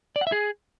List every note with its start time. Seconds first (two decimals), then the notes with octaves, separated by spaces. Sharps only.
0.16 D5
0.21 F#5
0.27 E5
0.32 G#4